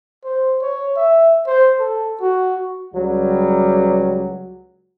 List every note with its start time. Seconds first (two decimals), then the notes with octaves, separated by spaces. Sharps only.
0.24 C5
0.62 C#5
0.97 E5
1.47 C5
1.79 A4
2.21 F#4
2.94 C#2 F#3 G3